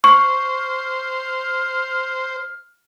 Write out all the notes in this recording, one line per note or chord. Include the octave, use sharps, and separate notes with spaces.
C5 C#6 F6